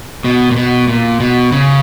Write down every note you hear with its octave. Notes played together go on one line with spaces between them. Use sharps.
B2
A#2
B2
A#2
B2
C#3